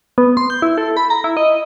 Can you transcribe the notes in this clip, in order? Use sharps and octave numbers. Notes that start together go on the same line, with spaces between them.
B3
C6
G6
E4
A4
B5
A#5
E4
D#5